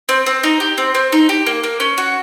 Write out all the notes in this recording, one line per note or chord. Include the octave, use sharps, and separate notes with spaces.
C4
C4
D#4
G4
C4
C4
D#4
G4
A#3
A#3
C#4
F#4